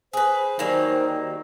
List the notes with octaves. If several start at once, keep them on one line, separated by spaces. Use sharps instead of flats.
G#4 B4 C5
D#3 F#3 G3 A#3